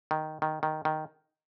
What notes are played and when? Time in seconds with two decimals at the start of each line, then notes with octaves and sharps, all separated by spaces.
0.11 D#3
0.42 D#3
0.63 D#3
0.85 D#3